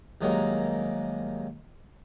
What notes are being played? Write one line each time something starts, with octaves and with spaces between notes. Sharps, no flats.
C2 D#3 F#3 G#3 A#3 A#5